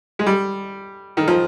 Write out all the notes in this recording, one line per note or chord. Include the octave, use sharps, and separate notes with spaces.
G#3
G3
D#3
F3